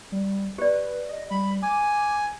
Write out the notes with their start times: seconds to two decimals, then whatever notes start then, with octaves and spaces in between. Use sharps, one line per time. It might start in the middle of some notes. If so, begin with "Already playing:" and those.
0.12 G3
0.58 G4 B4 D5
1.09 D#5
1.31 G3 B5
1.63 G#5 D6